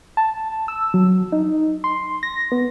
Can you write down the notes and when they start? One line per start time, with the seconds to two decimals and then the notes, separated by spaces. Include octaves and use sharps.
0.17 A5
0.68 E6
0.94 F#3
1.32 D#4
1.84 C6
2.23 A#6
2.52 B3